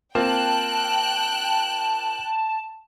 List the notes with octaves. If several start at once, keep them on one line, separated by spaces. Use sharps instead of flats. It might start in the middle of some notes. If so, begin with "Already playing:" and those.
A#3 C4 F4 G5 A5 F#6